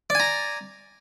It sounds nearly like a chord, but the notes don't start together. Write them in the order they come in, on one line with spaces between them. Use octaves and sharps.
D5 G#5 A#5